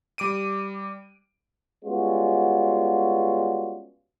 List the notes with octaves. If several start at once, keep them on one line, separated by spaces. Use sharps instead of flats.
G3 D6 D7 D#7
G3 G#3 B3 C#4 F4 F#4